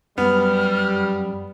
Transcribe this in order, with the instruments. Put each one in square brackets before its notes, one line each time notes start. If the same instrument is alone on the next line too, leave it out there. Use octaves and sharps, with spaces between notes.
[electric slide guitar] F#2 [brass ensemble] G3 [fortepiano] B3 [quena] F6